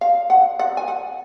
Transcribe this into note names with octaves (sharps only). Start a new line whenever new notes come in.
F5
F#5
F#5
G#5
F#5